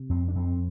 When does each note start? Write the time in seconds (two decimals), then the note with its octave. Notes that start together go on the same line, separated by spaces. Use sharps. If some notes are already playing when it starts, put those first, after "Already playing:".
Already playing: C3
0.09 F2 C4
0.28 D4
0.35 F2 C4